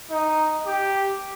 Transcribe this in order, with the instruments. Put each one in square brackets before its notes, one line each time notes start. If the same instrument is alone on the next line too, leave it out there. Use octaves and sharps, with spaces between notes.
[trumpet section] D#4
G4